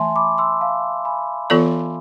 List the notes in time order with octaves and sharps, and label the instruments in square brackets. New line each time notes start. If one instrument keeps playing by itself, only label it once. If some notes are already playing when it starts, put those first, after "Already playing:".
Already playing: [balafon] E3 A3 [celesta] E5 G#5 A5 C6
[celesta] B5 D6
C6 E6
F5 A5
G#5 B5
[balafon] E3 B3 F4 A4 D5